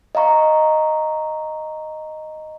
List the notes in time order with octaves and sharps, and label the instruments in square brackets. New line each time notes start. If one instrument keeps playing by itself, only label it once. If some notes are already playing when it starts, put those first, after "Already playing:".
[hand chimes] D#5 F5 A#5 C#6